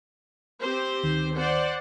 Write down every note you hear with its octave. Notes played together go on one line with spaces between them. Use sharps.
C4 G4 C5
D2 D#3
C5 D5 F#5